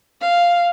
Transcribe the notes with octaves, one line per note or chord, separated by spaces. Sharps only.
F5